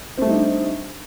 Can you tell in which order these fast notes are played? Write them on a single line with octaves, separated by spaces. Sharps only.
C4 A3 G3 D#4 D4